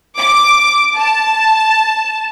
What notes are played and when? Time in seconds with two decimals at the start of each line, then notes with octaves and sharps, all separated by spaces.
0.19 D6
0.96 A5